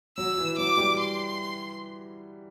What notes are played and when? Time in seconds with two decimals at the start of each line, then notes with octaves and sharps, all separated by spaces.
0.17 F#3 E6
0.38 E3
0.58 F#3 D6
0.77 G3
0.99 C6